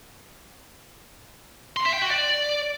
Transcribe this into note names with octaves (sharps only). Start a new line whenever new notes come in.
C6
E5
G5
F#4
D5